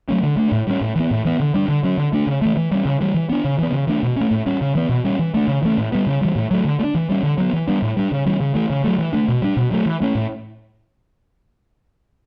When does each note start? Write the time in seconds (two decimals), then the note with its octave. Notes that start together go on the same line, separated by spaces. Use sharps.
0.09 F#3 A3 C#4
0.23 D3
0.37 A3 D4
0.52 A2
0.67 G3 C#4
0.81 A2
0.96 E3 B3
1.11 A2
1.25 E3 B3
1.40 D3
1.54 G3 D4
1.68 D3
1.84 F#3 C#4
1.97 D3
2.13 A3 D4
2.27 C#3
2.42 E3 A3
2.57 E3
2.71 G3 C#4
2.85 C#3
3.01 E3 G3
3.14 E3
3.30 B3 D4
3.45 C#3
3.59 E3 B3
3.73 C#3
3.87 E3 A3 D4
4.03 B2
4.16 A3 C#4
4.31 A2
4.46 G3 C#4
4.61 C#3
4.75 E3 B3
4.89 B2
5.05 G3 C#4
5.19 E3
5.34 A3 D4
5.48 C#3
5.63 E3 A3 C#4
5.78 A2
5.92 G3 B3
6.07 C#3
6.22 E3 G3
6.36 A2
6.51 F#3 A3
6.65 D3
6.80 A3
6.84 D4
6.95 E3
7.09 G3 C#4
7.23 D3
7.38 F#3 B3
7.53 E3
7.67 G3 B3 D4
7.82 A2
7.97 G3 D4
8.12 C#3
8.26 E3 G3 C#4
8.40 C#3
8.54 E3 A3
8.70 C#3
8.84 F#3 A3
8.99 E3
9.13 A3 D4
9.28 B2
9.42 G3 D4
9.57 B2
9.71 F#3 A3
9.86 E3
10.01 A3 C#4
10.15 A2